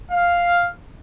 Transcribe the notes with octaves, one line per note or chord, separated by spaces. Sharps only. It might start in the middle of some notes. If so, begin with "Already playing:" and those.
F5